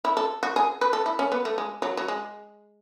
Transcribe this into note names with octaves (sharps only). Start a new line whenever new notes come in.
E4
A4
F#4
G#4
B4
A4
E4
C#4
B3
A3
G#3
F#3
F#3
G#3